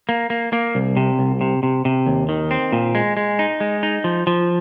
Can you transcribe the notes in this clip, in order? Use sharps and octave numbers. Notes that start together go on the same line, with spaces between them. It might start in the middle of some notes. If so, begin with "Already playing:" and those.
A#3
A#3
A#3
C2
C3
C2
C3
C3
C3
D#2
D#3
C4
A#2
G#3
G#3
D#4
G#3
D#4
F3
F3